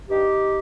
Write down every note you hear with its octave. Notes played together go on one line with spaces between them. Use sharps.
G2 D#4 G4